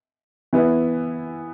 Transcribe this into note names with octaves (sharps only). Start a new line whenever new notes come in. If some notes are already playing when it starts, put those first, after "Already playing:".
E3 B3 E4